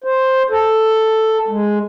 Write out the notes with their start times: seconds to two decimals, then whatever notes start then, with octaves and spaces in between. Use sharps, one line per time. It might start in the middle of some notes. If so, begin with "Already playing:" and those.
0.04 C5
0.50 A4
1.48 G#3